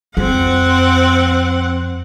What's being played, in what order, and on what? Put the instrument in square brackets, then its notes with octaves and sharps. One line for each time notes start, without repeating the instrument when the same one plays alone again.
[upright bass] F2 [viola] C4 F#5